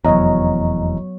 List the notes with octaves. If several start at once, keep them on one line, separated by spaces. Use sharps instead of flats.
F1 E2 F#3 B3 C#5 D#5 A#5